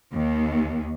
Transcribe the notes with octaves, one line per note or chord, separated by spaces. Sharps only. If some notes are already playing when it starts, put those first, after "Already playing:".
D#2